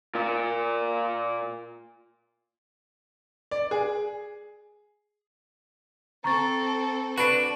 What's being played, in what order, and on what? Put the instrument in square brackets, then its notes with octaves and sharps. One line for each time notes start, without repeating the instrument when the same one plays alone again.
[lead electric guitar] A#2 F4
[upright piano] D5
G#4
[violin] C4 A4 [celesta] A#5 C#6 A6
[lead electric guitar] D4 F#4 [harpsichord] B4